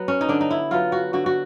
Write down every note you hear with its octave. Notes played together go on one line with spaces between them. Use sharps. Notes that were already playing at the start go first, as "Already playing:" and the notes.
Already playing: F#3 B3
C#4
D#4
D3 D4
D#4
E4
F#3 B3 F4
F#4
D3 F#4
F#4